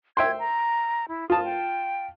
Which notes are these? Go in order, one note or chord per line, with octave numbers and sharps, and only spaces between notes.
E5 G5 C6 G#6
A#5
E4
F4 A5 D#6
G5